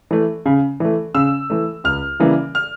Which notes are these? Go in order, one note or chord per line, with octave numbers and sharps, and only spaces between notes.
E3 A3
C#3
E3 A3
C#3 E6
E3 A3
C#2 F6
C#3 E3 G3 A#3
F6